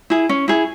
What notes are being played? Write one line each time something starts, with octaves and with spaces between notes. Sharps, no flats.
E4 G#4
C#4
E4 G#4